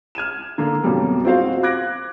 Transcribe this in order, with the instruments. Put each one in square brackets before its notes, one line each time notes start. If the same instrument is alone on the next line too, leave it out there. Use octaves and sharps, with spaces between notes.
[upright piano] F6 G#6 D#7 E7
D3 A#3
F2 B2 F#3 G3 A#3
C4 F4 F#4 C5 F5
D6 F#6 G#6 A#6 D7